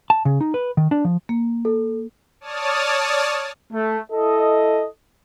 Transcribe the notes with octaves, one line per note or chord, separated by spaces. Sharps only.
A5
C#3
D#4
B4
D#3
D4
F3
A#3
A4
C#5 D5 A5 D#6 F6
A3
E4 A4 D#5